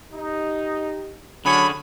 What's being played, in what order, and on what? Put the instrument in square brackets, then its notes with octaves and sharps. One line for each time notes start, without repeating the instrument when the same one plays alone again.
[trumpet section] D#4 [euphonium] G4
[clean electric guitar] D3 G#4 C#5 [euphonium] F#3 [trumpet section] C#4 D4 [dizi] B5